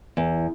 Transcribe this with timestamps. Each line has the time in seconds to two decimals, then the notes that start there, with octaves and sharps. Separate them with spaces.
0.17 E2